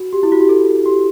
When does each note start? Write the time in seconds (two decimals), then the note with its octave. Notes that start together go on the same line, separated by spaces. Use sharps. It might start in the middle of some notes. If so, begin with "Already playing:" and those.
Already playing: F#4
0.13 G4
0.23 E4
0.32 F#4
0.40 G4
0.49 A4
0.86 G4